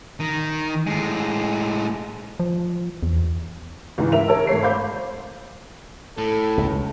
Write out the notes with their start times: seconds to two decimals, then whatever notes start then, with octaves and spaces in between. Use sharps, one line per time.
0.20 D#3
0.87 A2 G#3
2.40 F3
3.03 E2
3.98 C#2 G#2 E3
4.12 A#4 E5 F7
4.28 A#4 C#5 A5 E6
4.47 G#1 A3 C#5 C7
4.62 C5 F5 B5 D6 G6
6.18 A2 A4
6.57 C#2